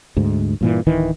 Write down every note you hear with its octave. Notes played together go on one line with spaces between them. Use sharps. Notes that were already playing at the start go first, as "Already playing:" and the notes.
D2 G#2
G2 A#2 E3
D1 D#3 E3